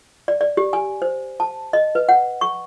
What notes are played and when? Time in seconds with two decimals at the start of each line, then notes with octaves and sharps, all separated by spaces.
0.28 D5
0.41 D5
0.57 G4
0.73 G#5
1.02 C5
1.40 A5
1.73 D#5
1.95 B4
2.09 F#5
2.41 C#6